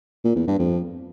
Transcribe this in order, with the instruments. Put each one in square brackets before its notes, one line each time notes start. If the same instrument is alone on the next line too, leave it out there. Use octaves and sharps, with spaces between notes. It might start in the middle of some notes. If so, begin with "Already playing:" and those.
[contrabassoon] A#2
E2
G2
F2